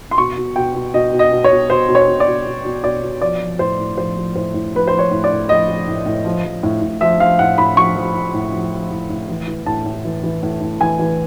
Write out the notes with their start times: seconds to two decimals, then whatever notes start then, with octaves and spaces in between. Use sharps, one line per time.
0.11 C6
0.18 B2 C#6
0.37 B2
0.56 B2 G5
0.75 B2
0.94 B2 D#5
1.13 B2
1.19 D#5
1.32 B2
1.44 C#5
1.51 B2
1.69 B2 C5
1.88 B2
1.95 C#5
2.08 B2
2.20 D5
2.27 B2
2.45 B2
2.65 B2
2.83 B2 D5
3.03 B2
3.22 F3 D5
3.41 F3
3.59 A2 C5
3.78 A2
3.97 F3 C5
4.16 F3
4.35 A2 C5
4.54 A2
4.74 F3 B4
4.88 C5
4.93 F3
4.99 C#5
5.11 A2
5.24 D5
5.30 A2
5.49 F3 D#5
5.68 F3
5.88 A2
6.06 A2
6.25 F3
6.44 F3
6.63 A2
6.82 A2
7.01 F3 E5
7.20 F3 F5
7.39 A2 F#5
7.58 A2 B5
7.77 F3 C#6
7.96 F3
8.15 A2
8.34 A2
8.53 F3
8.72 F3
8.91 A2
9.10 A2
9.29 E3
9.48 E3
9.66 A2 A5
9.86 A2
10.05 E3
10.23 E3
10.43 A2
10.61 A2
10.80 E3 G#5
10.99 E3